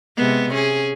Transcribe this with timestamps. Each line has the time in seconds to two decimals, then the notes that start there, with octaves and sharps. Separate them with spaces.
0.16 C3 G#3 B3
0.54 C#4 G#4